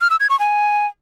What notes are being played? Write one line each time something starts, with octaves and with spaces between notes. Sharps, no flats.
F6
E6
G#6
C#6
G#5